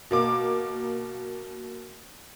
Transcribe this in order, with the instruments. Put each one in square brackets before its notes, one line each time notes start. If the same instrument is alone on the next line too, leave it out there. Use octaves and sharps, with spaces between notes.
[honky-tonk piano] B2 A#3 D6